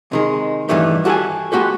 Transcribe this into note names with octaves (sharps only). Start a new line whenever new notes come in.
C3 D#3 G#3
G2 A#2 D#3 E3 G3 A3
F#4 G4 A4 B4 F#5 G#5
G#3 A#3 F#4 G4 A4